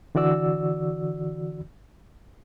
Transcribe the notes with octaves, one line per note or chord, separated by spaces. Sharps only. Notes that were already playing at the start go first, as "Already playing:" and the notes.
D3 E3 F#4 D5 E6